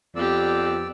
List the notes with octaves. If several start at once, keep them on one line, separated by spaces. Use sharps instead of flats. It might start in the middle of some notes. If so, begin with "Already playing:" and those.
F2 B3 G4 D5 E6